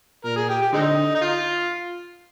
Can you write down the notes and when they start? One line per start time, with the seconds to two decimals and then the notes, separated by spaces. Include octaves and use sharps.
0.25 A#2 A#4
0.36 G#4
0.49 G4
0.61 G4
0.73 D3 G#3 C4 D#4
1.15 D#4
1.21 F4